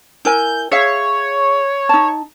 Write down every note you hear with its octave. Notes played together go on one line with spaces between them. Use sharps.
E4 A#4 G#5 G6
G#4 C#5 E5 F5
D#4 A5